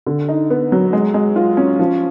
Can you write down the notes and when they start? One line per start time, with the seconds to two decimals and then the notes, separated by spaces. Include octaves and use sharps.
0.07 D3
0.29 D#4
0.50 B3
0.72 F#3
0.93 G#3
1.14 G#3
1.36 F4
1.57 C#4
1.79 F3